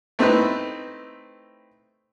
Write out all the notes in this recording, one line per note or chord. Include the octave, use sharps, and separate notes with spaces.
A3 C4 D#4 E4 B4